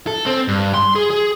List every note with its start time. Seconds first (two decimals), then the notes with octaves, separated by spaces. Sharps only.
0.07 A4
0.26 C4
0.48 G2
0.74 C6
0.96 G#4
1.10 G#4